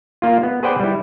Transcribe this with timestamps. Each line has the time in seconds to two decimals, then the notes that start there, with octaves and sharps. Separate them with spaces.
0.22 A#3 F4
0.43 B3
0.63 G#4 B4 C5 D5 F#5 G5
0.80 G3 E4